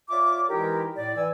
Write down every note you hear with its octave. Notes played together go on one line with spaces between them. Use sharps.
F4 C#5 D5 E5 D6
E3 G#3 D#4 E4 G4 A#4
A2 D5
E3 G#5 E6